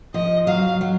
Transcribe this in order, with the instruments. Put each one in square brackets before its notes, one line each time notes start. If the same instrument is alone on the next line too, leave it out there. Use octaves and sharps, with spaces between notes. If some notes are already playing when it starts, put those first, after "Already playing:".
[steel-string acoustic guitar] F3 [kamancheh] D#5
[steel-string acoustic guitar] F#3 [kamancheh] F5
[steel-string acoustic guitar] F#3